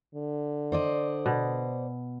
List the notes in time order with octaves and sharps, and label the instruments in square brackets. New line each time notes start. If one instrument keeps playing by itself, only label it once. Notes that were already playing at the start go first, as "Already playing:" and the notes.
[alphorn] D3
[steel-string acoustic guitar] C5 D5 D#5
[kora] B2